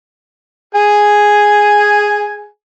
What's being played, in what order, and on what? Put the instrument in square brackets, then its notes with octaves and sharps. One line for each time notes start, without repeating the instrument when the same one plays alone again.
[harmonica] G#4 G#5